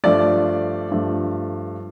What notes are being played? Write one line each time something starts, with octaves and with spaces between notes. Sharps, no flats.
G2 F3 A3 D5
G2 F3 A3